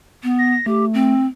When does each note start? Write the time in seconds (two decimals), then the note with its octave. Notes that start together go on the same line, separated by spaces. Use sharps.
0.23 B3
0.38 A#6
0.66 A3 G4
0.94 C4